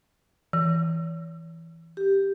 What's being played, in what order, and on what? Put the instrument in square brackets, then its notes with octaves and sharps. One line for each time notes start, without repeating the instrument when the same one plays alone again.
[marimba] E3
[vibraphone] G4